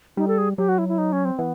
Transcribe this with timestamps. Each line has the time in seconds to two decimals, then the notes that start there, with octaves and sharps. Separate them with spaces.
0.17 G3 D#4
0.28 A4
0.38 G#4
0.58 F#3 G4
0.69 F#4
0.78 E4
0.88 E4
0.98 D#4
1.12 C#4
1.25 C4
1.38 E3 B3